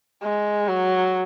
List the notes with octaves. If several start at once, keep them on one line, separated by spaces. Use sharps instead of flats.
G#3
F#3